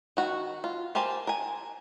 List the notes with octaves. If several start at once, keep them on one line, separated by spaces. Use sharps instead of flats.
D#3 F#4
F4
G4 A#4 C5 G#5 A5
A#4 G#5